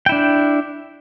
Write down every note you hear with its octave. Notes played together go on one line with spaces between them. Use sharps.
D4 E4 G5